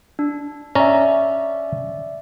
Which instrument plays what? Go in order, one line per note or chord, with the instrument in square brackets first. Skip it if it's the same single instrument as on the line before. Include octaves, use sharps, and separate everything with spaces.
[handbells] D4
[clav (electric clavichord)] C#4 A#5 [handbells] D5 E5